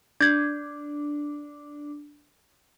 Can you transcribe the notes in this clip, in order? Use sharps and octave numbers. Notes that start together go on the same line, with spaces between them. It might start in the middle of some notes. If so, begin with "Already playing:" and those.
D4 G6 G#6